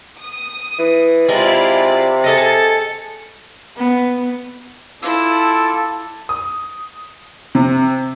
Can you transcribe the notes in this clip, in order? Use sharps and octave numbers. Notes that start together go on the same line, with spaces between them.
D#6
E3
C3 G#3 E4 F4 D5
G#4 A4 D#5 A6 C#7
B3
E4 F4 A4 D6 E6
D#6
C3